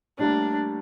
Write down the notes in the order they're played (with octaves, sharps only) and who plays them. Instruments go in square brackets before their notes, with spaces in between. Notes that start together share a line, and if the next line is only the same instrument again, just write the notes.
[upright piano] A2 G3 A#3 [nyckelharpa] D4